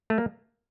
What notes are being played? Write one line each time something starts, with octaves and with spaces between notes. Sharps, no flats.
A3
A#3